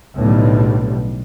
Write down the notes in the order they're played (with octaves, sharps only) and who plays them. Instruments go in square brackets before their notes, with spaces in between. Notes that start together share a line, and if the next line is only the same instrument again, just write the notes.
[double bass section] B1 A2 D3 G3